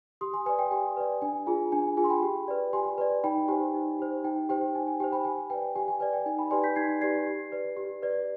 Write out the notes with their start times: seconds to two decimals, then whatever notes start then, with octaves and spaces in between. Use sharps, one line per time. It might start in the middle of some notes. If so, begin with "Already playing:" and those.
0.21 G4 C6 D#6
0.33 G#5 C6
0.46 B4 D5 G#5
0.59 G5
0.71 G4 G#5
0.97 B4 D5
1.22 D4 G#5
1.47 F4 G#4 G#5
1.72 D4 G#5
1.97 F4 G#4 G#5
2.04 C6
2.10 G5 B5
2.22 G4
2.48 B4 D5
2.73 G4 G#5 C6
2.98 B4 D5
3.24 D#4 G5 B5
3.48 G4 C5 G#5
3.74 D#4
3.99 G4 C5
4.24 D#4 G5
4.49 G4 C5 G5
4.75 D#4 G#5
4.87 G#5
5.00 G4 C5 G5
5.12 G5 B5
5.25 G4 G#5
5.50 B4 D5 G5
5.76 G4 G#5
5.88 G#5
6.00 B4 D5 G#5
6.13 G5
6.26 D#4 G#5
6.38 G5 B5
6.51 G4 B4 D5 G#5 C6
6.64 G6 B6
6.76 D#4 G#6 C7
7.01 G4 B4 D5 G#6 C7
7.26 G4
7.52 B4 D5
7.77 G4
8.02 B4 D5